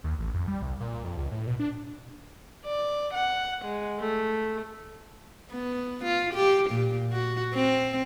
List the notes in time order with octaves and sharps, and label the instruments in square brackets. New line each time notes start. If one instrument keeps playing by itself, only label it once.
[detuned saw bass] D#2
A1
F2
G3
C2
A#2
F2
C#2
A2
B2
D4
[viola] D5
F#5
G#3
A3
[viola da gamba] B3
F4
G4
A#2
F#4
C4